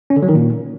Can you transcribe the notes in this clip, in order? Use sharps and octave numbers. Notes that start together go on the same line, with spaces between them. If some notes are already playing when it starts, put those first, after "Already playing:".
C#4
D3
F#3
D#3
A#2